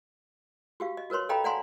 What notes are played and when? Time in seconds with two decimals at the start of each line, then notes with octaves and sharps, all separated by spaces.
0.80 F#4 G4 F5
0.97 D#5
1.10 F#4 A#4 B4 C#5 C6
1.29 A4 D#5 F5 G5 A#5 B5
1.44 D5 F5 F#5 G#5 A#5 C6